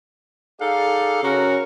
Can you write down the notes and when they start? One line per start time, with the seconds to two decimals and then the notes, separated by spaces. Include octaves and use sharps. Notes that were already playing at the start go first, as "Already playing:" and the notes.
0.61 D#4 G#4 A4 D5 F5
1.22 C#3 C#4 F#4 A#4